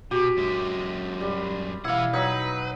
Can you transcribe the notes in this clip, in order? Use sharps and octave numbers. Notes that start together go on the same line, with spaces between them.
B2 F#4 G4
F#2 G#3
G3
B2 E3 E4 F5 F#5
F#3 D#4 B4